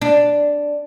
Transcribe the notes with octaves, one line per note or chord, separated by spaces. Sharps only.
D4